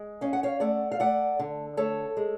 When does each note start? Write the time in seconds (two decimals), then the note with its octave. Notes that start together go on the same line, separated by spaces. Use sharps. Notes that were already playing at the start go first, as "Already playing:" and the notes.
Already playing: G#3
0.21 C#4 F5
0.33 F#5
0.43 C#5 F5
0.60 A3 D5 F#5
0.91 F5
1.00 A3 D5 F#5
1.39 D3
1.77 A3 A4 C#5
2.17 G#3